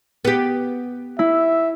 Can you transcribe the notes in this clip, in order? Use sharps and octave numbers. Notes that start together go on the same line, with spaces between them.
B3 G4
E4 E5